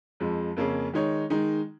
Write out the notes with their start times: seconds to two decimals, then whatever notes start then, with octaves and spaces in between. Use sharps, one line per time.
0.20 F2 F3 G#3
0.56 F2 C#3 A#3 C#4 G#4
0.93 D#3 G#3 D#4 C#5
1.30 D#3 G#3 D#4